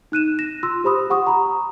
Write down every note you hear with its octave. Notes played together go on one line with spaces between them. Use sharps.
D#4 F#6 D#7 E7
A#6 E7
F4 C6 E6
G4 C5 B5 D#6
G4 F#5 C#6 D#6
A#5 B5